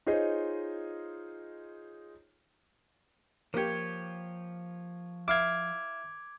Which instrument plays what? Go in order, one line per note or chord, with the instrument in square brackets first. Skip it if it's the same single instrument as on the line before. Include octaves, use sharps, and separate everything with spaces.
[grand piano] D#4 F4 G#4 C5 C#5 D#5
[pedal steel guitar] F3 C#5 [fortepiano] A#3 G4
[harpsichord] E4 F5 [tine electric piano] D6 G#6